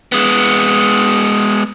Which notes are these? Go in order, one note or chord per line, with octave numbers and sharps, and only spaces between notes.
G#3 B3